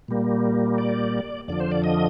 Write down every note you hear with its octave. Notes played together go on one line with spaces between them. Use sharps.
A#2 G3 A#3
D5
F2 D3 F3 D5
C5
D5
D#5